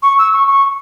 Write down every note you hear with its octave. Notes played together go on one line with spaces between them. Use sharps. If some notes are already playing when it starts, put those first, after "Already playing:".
C#6
E6
C#6
C#6